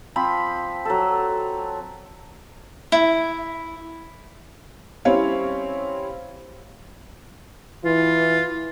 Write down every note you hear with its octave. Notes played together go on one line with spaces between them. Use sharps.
F3 C4 B5 C6
F#3 A4
E4
G3 C4 C#4 E4 C#5 F5
E3 F4